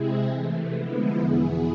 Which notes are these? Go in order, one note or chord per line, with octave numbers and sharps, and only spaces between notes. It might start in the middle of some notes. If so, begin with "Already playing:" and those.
Already playing: C3 G#3 C4 E4 G#4
C3 E3 A3
D3 F3 G#3 B3 E4
E2 B2 B3 E4 G#4